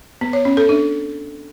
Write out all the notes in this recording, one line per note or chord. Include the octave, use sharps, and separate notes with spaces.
B3
C#5
C#4
A4
D4